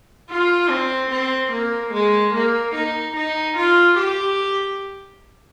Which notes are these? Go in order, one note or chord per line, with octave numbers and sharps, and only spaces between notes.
F4
C4
C4
A#3
G#3
A#3
D#4
D#4
F4
G4